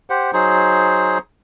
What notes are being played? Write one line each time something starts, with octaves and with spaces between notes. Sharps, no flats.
G4 C5 F#5
F#3 D#4 G#4 C5